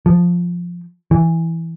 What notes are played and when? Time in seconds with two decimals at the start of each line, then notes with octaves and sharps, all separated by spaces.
0.06 F3
1.11 E3